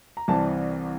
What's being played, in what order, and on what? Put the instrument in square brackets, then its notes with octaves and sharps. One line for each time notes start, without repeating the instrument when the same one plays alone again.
[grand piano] A#5
C2 C3 E3 G3 C4 A5